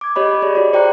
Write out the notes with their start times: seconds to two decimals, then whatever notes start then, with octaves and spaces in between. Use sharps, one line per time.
0.01 D6 G#6
0.16 G4 C#5 D#5 B5
0.27 G4
0.42 G#4 C#5 D5
0.55 F#4 D5
0.73 C5 D5 G5 A#5 F#6 C#7